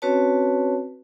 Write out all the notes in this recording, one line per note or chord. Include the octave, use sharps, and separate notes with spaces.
C4 C#4 F#4 B4 C#5 A5